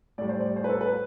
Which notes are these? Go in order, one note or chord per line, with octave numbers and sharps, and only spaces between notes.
A2 G3 D5
C5
D5
C5
B4
A4
B4